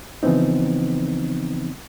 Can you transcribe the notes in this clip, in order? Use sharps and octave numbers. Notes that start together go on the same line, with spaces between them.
C#3 E3 F3 B3 C4 D#4